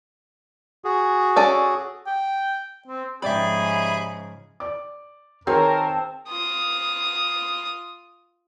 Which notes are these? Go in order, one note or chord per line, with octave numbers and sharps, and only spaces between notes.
F#4 G#4
C#4 A4 D5
G5
C4
G#2 C#3 F3 G4 G#4 D5 E5 B5
D5 D6
D#3 C4 G#4 A#4 C#5 A5
F4 D#6